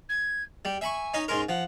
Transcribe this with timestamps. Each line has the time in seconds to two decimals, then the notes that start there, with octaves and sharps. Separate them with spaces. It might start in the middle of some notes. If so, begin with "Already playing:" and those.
0.09 G#6
0.65 G3 G5
0.81 E5 G#5 B5 C#6
1.14 C#4 D#4 D#5
1.28 G#2 C#4 A#4 C6
1.49 F3 F#5